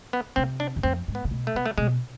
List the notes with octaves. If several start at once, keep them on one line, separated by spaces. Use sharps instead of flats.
B3
C3 C4
D4
E2
F2 C4
G#2
B3
C3
B2
A3
C3 B3
A3
B2 G#3